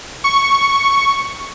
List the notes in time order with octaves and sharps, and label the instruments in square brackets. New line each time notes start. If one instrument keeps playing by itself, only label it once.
[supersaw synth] C#6